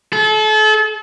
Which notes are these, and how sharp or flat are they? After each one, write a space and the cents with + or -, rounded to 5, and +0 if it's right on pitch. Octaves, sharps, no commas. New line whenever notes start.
A4 -35